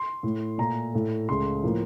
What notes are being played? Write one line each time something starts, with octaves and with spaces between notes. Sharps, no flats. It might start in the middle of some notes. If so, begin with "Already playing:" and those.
Already playing: C6
A2 A3
A#2 A3 A#5
A2 A3
C#2 C#3 A3 C6
A2 F3 A#3